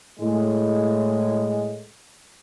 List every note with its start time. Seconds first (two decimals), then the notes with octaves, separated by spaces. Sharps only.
0.20 A2 G#3